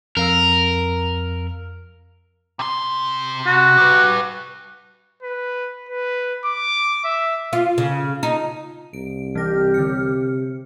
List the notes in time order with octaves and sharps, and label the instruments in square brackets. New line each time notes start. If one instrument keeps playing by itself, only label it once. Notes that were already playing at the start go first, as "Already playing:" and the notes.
[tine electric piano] F2 F5 E6 [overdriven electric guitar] A#4
[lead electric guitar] C3 C6
[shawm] F#4
[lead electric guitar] G4 B4
[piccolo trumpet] B4
B4
D6
E5
[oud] F4
C#3
D#4
[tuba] C2 [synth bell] D7
[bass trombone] C3 [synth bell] E3 A#6 [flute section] G4 F6
[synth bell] D3 C#7